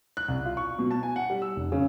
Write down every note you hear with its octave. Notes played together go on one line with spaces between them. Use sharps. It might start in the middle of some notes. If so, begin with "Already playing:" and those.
F#6
C2
F4
C#6
B2
A5
G#5
F#5
G3
E6
F1
C#3